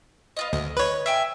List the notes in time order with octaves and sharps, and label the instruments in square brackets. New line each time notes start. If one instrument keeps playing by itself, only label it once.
[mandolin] B3 F4 D#5
[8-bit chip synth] D2 [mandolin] D#5
[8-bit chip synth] B4 C#5
[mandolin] E5 G5 G#5